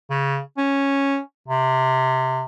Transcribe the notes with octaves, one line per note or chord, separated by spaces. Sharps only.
C#3
C#4
C3